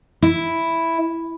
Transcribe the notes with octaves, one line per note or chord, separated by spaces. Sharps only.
E4